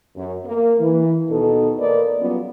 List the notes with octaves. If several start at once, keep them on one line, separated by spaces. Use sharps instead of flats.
F#2
A#3
E3
D#2 B2 D#4 A4
A#3 A#4 B4 D5 D#5
F#3 G3 B3 C#4 F4